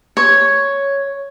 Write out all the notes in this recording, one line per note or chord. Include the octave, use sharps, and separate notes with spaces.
C#5